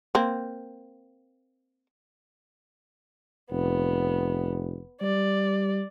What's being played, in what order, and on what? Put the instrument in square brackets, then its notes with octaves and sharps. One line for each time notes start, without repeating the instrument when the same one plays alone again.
[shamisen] A#3 C4
[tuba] F1 [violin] B3
[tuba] G3 [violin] D5